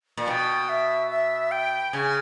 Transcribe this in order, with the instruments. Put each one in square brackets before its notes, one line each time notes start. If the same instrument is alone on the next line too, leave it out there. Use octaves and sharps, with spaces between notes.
[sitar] A#2
[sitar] B2 [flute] G5
[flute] E5
E5
G5
[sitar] C#3 [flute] G#5